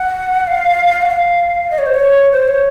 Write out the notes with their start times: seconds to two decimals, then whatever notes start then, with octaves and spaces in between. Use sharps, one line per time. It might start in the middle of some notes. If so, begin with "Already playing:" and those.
Already playing: F#5
0.47 F5
1.02 F#5
1.09 F5
1.71 D#5
1.78 C#5
1.86 C5
1.94 C#5
2.32 C5
2.48 C#5